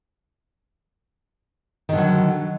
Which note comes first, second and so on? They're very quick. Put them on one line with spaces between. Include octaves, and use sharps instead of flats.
D#3 D3 F#3